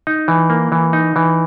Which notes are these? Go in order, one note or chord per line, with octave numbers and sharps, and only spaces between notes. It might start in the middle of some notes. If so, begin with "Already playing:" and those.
D#4
E3
A#3
E3
D#4
E3